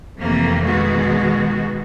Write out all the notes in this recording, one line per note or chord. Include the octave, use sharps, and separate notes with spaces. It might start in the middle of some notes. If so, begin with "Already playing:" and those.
F2 C3 E3 A3 A#3
B2 D#3 G#3 F#4